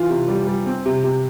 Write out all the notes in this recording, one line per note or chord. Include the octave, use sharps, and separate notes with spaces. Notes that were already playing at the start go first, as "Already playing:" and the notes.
Already playing: E3 F4
C3
G3
G3
C4
C3
C3